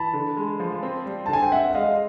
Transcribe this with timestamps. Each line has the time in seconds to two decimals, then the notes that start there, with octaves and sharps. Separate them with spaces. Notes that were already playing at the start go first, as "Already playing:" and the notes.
Already playing: E3 A5 B5
0.13 D3
0.37 G#3
0.60 F3
0.83 C4
1.06 G3
1.26 D3 A5
1.33 G#5
1.43 G5
1.52 C4 E5 F#5
1.71 E5
1.75 G#3 D#5 F5